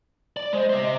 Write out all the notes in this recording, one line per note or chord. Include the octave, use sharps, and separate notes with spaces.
D5
G#3 C5 D#5
C5 D#5 E5